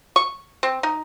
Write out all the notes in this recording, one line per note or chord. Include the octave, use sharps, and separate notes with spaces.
C#6
C4
D#4